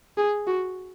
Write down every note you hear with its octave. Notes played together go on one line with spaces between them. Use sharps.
G#4
F#4